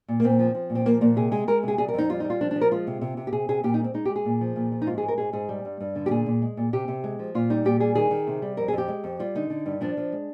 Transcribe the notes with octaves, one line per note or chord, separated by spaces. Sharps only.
A#2
A#3
A#2 C4
F3
F3
A#2
C4
F3 A#3
A#2 A#3
C3 G#4
G#3 G#4
G#3 A#4
C3 G#4
G3 G#4
A#4
F2 D#4
G3 F4
D#4
G3
F4
F3 D4
D4
F3
A#4
G#3 F4
C3
C3
C3
G4
C3 G#4
C3 G#4
A#2 G4
D#4
G#3 C4
G#3 D#4
G4
G#3
G#4
A#2
F3
A#2
F3
D#4
G#2 F4
G#4
G#3
A#4
G#2 G#4
G#2 G#4
G3
G2
G2
D3
G4
A#2 G#4
A#2
G#3
A#2
C3 G4
C3
G#3
F3
A#2 F4
G3 D#4
A#2 G4
G3 G#4
D#3 G#4
D#3
C3
G3
F2 A#4
G#4
F2
G4
G#3
F2
G3 F4
D3 D#4
D3
G2
F3 D4
F3
G#3